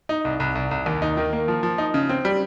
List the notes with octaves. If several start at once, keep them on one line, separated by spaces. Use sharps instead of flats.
D#4
C2
C2
C2
C2
D#2
D#4
D#3
A#3
F3
F3
D#4
C#3
C4
G3